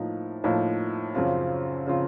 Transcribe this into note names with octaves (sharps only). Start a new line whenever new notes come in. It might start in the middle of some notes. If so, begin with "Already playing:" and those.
Already playing: A2 F3 A#3 D#4
A2 F3 A#3 D#4
F#2 C#3 F3 C4 F4
C#3 F3 C4 F4